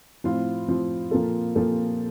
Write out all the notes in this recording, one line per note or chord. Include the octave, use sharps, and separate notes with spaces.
A2 F3 C4 F4
A2 F3 C4 F4
A#2 F3 A#3 F4 A4
A#2 F3 A#3 F4 A4